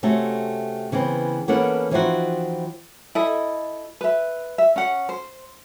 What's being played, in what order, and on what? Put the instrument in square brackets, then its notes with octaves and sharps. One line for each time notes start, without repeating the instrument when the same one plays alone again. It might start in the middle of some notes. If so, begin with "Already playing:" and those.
[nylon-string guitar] C3 A3 C#4 F#4 A4
C#3 E3 B3 C4
E3 A#3 B3 C#4 A4 F#5
E3 F3 C4 D#4 F4 F#4
[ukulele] E4 A4 D#5
B4 E5
E5
C#4 F#5
C5